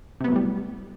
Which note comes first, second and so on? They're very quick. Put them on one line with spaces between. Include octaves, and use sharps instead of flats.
C3 B3 F#3 A2 G3